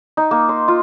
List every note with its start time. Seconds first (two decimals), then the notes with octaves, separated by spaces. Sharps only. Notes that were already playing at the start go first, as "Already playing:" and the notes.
0.17 D#4
0.31 A#3
0.49 C6
0.68 F4